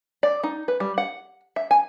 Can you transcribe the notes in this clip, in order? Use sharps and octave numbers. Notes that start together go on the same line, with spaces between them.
D5
D#4
B4
G3
F#5
E5
G#5